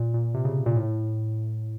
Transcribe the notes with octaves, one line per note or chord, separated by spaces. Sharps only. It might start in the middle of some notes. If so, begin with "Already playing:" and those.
Already playing: A#2
A#2
C3
C#3
A#2
A2